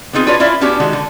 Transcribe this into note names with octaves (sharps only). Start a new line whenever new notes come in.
B3 C4 D#4 F4 G#4
D4 F4 F#4 B4 C#5 D5
C#4 E4 F4 D5 E5
B3 C#4 D4 F#4 G4
D#3 G#3 F#4
D3